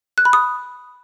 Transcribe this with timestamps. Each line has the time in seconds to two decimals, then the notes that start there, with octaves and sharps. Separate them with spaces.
0.18 F#6
0.25 B5
0.33 D#6